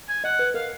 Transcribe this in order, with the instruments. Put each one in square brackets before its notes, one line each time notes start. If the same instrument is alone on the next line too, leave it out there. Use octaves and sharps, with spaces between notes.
[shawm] G#5
[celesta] D#5 [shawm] F#5
[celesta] B4
[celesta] A#4 [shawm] F5